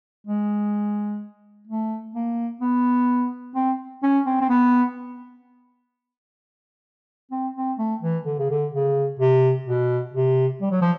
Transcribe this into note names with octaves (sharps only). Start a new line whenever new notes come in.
G#3
A3
A#3
B3
C4
C#4
C4
C4
B3
C4
C4
A3
E3
D3
C#3
D3
C#3
C3
B2
C3
G3
F#3
F3